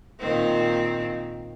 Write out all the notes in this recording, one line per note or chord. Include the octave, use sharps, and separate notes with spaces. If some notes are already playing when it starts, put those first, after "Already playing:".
A#2 D#3 C4